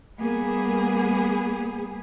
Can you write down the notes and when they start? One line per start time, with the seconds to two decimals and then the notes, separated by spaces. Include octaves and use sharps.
0.17 G3 A#3 B3 G#4